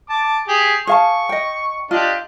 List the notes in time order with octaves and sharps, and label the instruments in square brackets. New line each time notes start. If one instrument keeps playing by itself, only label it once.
[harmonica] A5 D6
G4 G#4
[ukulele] G#4 F5 A5 [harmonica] C#6
[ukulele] D#5 G5
[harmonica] D4 G4 D#5 [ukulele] F4